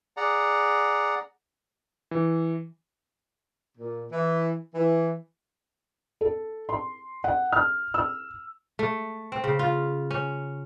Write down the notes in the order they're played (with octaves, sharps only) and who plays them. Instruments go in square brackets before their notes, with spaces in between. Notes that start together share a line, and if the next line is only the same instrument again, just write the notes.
[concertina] G#4 D5 F#5 A#5
[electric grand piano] E3
[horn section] A#2
E3
E3
[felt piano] A4
C6
F#5
F6
E6
[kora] A3
C4
C#3
F4
C#4